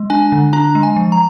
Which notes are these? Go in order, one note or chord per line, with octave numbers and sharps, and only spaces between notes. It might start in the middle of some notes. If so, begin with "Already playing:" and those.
Already playing: G#3
D4 G#5
D3
D4 A#5
G#3
G#5
F3
A#5